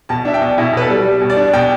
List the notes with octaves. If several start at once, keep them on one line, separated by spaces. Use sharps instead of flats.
B2 A5
D4 E5
G5
B2
B2 E4
B2 B4
A4
G3
G3
B2
D5
D4
B2 G5